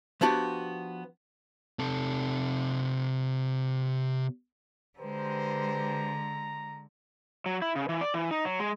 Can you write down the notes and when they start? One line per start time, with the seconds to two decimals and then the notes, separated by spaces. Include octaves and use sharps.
0.21 F3 B3 D4 F#4 G4
1.79 C3 A4
4.99 D3 G#3 G4 B4 C5 A#5
7.46 F#3
7.62 E4
7.75 C#3
7.89 E3
8.01 D5
8.14 E3
8.31 D#4
8.45 F#3
8.60 G#3